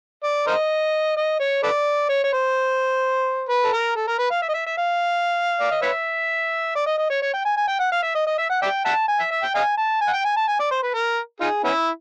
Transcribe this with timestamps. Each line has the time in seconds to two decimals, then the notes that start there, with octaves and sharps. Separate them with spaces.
0.23 D5
0.47 A#4 C5 D#5
1.16 D#5
1.40 C#5
1.63 A4 B4 D5
2.09 C#5
2.24 C#5
2.33 C5
3.49 B4
3.64 A4
3.73 A#4
3.96 A4
4.08 A#4
4.19 B4
4.31 F5
4.42 E5
4.49 D#5
4.54 E5
4.66 E5
4.78 F5
5.61 D5
5.71 D#5
5.82 B4 C#5 E5
6.75 D5
6.87 D#5
6.98 D#5
7.10 C#5
7.22 C#5
7.34 G5
7.45 G#5
7.57 G#5
7.68 G5
7.80 F#5
7.92 F5
8.03 E5
8.15 D#5
8.27 D#5
8.38 E5
8.50 F#5
8.62 D5 E5 G5
8.85 E5 F#5 A5
9.08 G#5
9.20 E5
9.31 E5
9.43 G5
9.55 D#5 F5 G#5
9.78 A5
10.01 G#5
10.08 F#5
10.13 G5
10.25 G#5
10.37 A5
10.48 G#5
10.59 D5
10.71 C5
10.83 B4
10.94 A#4
11.40 D#4 F4 G#4
11.64 B3 C#4 E4